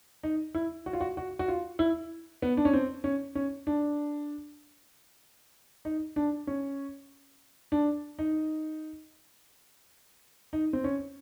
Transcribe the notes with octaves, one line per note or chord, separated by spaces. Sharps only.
D#4
E4
F#4
F4
F#4
F#4
F#4
F4
E4
B3
D4
C#4
C4
C#4
C#4
D4
D#4
D4
C#4
D4
D#4
D#4
C4
C#4